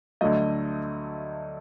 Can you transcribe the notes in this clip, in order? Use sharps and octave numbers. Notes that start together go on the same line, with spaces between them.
D2 D3 F#3 A3 D#5